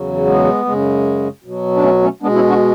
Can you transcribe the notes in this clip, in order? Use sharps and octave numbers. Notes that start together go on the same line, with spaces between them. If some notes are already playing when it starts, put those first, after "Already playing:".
Already playing: E2 C#3 F#3
G#3 B3
F#2 C#3 G#3
B2 F#3
D4
A3 C#4
A3 C#4
B2 G#3 B3 D4
C#4 E4
D4 F#4